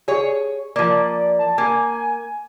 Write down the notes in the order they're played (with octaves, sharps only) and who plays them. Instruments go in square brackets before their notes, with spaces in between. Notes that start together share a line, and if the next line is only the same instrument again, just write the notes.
[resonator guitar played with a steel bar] G#4 C#5
[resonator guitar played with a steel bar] F3 A#3 [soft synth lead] D5
[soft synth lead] A5
[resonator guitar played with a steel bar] A#3 [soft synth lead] G#5